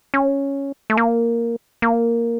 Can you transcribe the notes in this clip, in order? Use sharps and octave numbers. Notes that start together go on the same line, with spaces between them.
C#4
A3
A#3
A#3